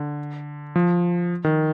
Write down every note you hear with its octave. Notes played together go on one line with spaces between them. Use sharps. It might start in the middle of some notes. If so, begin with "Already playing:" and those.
Already playing: D3
F3
D#3